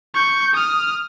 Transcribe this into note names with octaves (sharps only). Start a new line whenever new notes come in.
C#6 G6
D#6 F6